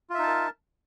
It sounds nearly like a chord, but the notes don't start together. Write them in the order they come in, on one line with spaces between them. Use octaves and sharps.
F4 E5 D#4 A5 A#4